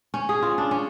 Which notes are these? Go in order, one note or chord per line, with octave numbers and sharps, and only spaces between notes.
C#4
G#4
F4
D4
C#4